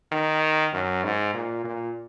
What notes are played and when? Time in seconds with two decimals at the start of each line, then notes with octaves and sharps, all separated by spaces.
0.12 D#3
0.73 F#2
1.04 G#2
1.34 A#2
1.64 A#2